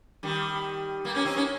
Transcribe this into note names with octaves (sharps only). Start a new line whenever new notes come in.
D#3 G3
G3 A#3
A#3 C#4
C4 D#4
A#3 C#4